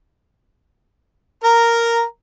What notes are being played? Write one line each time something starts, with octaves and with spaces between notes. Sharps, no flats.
A#4 A#5